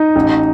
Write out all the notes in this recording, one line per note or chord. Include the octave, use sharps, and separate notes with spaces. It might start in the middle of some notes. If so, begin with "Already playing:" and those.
Already playing: D#4
A1